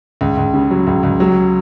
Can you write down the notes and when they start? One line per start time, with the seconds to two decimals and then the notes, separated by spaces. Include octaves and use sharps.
0.21 C#2
0.37 C#2
0.54 C#3
0.71 F#3
0.87 C#2
1.03 C#2
1.20 F#3